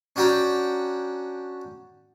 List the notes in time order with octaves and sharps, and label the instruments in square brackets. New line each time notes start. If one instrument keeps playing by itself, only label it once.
[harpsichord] C#4 D4 F#4 G5 A#5